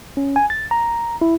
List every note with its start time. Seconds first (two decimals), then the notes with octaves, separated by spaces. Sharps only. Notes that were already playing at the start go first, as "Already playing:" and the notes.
0.17 C#4
0.36 G#5
0.50 A6
0.71 A#5
1.21 E4